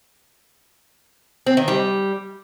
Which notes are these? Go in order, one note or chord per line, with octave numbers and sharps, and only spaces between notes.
C4
D#3
G3